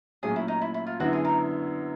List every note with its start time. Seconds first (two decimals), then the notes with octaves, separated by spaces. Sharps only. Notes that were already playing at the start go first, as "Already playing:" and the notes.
0.23 A#2 F#3 A3 C#4 G#4
0.36 E4
0.48 D#4
0.61 E4
0.74 E4
0.87 F4
1.00 F#2 D3 F#3 B3 E4 F#4
1.13 G#4
1.25 A#4